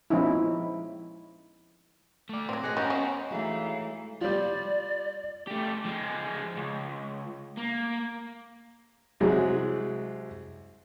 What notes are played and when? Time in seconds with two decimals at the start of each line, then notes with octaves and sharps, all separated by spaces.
0.10 F3 G#3 B3 C#4 D#4 E4
2.29 A3 D5
2.49 A2 F#3 C4
2.63 G#4 D#5 F#5
2.77 G3 C#4 F#4 A#4
2.90 B3 C#4 C5
3.31 E3 F#3 G#3 A3 D#4 F5
4.21 F3 G3 D5
5.47 A3 G4
5.85 F3 G#3
6.57 C#2
7.57 A#3
9.20 C2 F#3 G#3